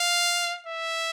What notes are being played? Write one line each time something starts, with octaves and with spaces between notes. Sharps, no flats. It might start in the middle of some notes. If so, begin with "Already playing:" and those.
Already playing: F5
E5